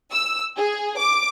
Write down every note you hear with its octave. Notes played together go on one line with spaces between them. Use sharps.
E6
G#4
D6